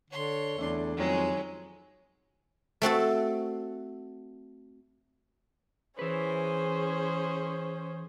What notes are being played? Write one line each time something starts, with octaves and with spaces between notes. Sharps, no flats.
D3 C#5 C6
E2 A3 D4
F2 D#3 F#3 G#3 C#4
A3 C4 F#4 A4
E3 C#4 G#4 B4 C5